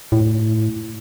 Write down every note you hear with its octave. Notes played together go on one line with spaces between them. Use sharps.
A2